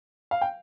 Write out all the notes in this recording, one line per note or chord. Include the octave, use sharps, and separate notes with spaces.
F5
G5